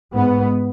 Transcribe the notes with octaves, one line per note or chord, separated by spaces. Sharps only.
G#2 B3